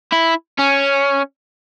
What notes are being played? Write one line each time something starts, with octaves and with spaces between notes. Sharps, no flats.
E4
C#4